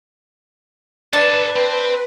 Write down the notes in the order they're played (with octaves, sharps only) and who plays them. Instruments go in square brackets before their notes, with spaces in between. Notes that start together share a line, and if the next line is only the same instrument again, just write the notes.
[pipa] D4 [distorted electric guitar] A4 G#5 [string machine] B4 [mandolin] A5
[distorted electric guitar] C4